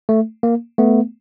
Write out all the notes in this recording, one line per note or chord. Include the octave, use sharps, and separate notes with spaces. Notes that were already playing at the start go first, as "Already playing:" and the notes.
A3
A#3
A3 B3